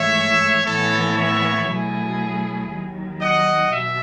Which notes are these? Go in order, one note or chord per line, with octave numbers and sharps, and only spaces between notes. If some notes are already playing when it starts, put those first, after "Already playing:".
Already playing: G#2 E3 A3 C#5 E5
A2 E3 B3 E4 A4 C#5
C#5 E5
B2 F#3 A3 E4 G#4
D#2 D#3 F#3
D#5 F#5
B2 E5